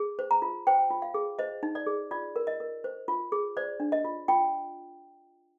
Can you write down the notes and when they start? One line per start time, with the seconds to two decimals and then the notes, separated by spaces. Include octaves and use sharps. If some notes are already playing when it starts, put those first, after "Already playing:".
Already playing: G#4
0.19 C5
0.31 A#5
0.42 F4
0.67 C5 G5
0.90 F4
1.02 F5
1.14 G#4
1.39 C5 D#5
1.63 D#4
1.75 D5
1.87 G#4
2.11 F4 D5
2.36 A#4
2.47 D#5
2.60 A#4
2.84 C5
3.08 F4
3.32 G#4
3.57 C5 D5
3.80 D4
3.92 D#5
4.05 F4
4.28 F4 G5